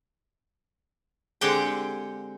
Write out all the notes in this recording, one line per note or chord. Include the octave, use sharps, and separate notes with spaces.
D3 G#3 C4 G4 F#5 G5